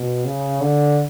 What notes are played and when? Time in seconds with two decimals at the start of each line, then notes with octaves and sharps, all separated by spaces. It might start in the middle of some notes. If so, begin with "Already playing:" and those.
Already playing: B2
0.25 C#3
0.61 D3